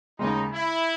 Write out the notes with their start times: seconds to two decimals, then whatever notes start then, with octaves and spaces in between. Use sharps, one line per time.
0.19 D#2 C#3 G#3 D#4
0.53 E4